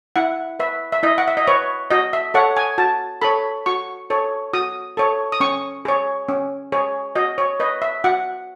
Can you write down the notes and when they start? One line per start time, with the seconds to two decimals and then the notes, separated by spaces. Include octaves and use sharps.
0.16 E4 F#5
0.60 B4 E5
0.92 E5
1.03 E4 D#5
1.18 F#5
1.28 E5
1.37 D#5
1.48 B4 C#5
1.90 F#4 D#5
2.13 E5
2.34 A4 C#5 F#5
2.57 G#5
2.78 F#4 A5
3.22 A4 C#5 B5
3.66 F#4 C#6
4.10 A4 C#5
4.53 F#4 D#6
4.97 A4 C#5
5.32 D#6
5.40 C#4 C#6
5.85 G#4 C#5
6.29 C#4
6.72 G#4 C#5
7.16 F#4 D#5
7.38 C#5
7.60 B4 D#5
7.82 E5
8.04 F#4 F#5